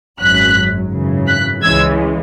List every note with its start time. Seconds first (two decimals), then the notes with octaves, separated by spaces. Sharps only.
0.21 G#1 F#2 F#3 F#6 B6
0.92 G#1 F#2 C#3 E3
1.27 F#6 B6
1.62 C#2 C#3 E3 G#3 E6 G#6